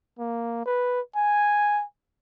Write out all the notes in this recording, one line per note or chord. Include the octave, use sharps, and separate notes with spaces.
A#3
B4
G#5